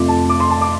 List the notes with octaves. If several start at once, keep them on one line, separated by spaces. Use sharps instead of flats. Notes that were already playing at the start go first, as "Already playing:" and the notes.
Already playing: F2 C3 A3 F4 D6
A5
D6
C6
A5
D6